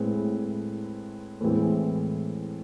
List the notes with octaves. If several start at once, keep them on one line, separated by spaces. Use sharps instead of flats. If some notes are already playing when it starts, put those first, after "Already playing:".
Already playing: A2 G#3 C4 E4 B4
A2 E3 G#3 C4